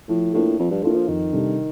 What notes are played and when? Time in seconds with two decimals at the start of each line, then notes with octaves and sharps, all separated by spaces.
0.08 A2 F3
0.33 A2 A#3 D4 F4 A4
0.58 F2 F3
0.71 G2
0.83 A2 A#3 D4 F4 A4
0.96 F3
1.08 F2 D#3
1.33 C3 G3 D4 A4